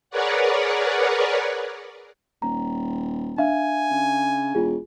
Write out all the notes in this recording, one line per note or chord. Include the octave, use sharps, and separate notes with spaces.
G#4 A#4 B4 C#5 D5 F#5
D#1 A#5
D4 E5 F5 G#5
C#3
E1 F4 G#4